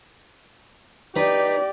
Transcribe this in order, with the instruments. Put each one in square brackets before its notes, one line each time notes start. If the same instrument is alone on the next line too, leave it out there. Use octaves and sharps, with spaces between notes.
[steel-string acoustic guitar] D#4 B4 [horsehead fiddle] G4 D5